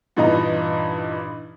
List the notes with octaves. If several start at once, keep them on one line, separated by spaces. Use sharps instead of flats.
G2 A#2 E3 D#4 D#5 A#5